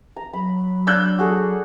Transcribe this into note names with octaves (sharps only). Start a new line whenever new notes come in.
A#5
F#3 B5
D4 E6 F#6 G6
F#4 G#4 A4